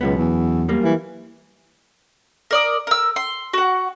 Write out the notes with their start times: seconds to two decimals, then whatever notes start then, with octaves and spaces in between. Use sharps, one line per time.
0.01 C#2 F#2 B2 B3
0.18 E2
0.68 F#2 G3 A#3
0.84 E3
2.51 A#4 D5 D#6
2.87 A#4 E6
3.16 C6
3.54 F#4 F#5